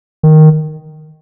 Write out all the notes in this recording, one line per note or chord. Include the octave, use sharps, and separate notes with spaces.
D#3